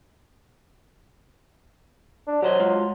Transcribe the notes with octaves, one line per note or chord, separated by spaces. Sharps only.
D4
F#3 G4 C5 D#5
G#3 F4